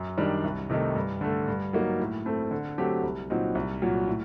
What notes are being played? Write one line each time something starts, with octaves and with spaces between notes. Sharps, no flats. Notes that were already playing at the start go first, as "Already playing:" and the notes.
Already playing: F#2
D#3 G3 D4
C2
C3 D#3 A3 D#4
G2
D3 A3
G2
F#3 A#3 D#4
A2
A3 C4
D3
F#3 A3 C4 G4
C2
A#2 F#3 C4 D#4
C2
A#2 F#3
A2